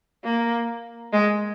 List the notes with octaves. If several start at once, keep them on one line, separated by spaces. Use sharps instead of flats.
A#3
G#3